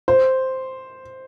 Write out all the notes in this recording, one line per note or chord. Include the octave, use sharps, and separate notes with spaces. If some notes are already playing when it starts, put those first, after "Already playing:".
C5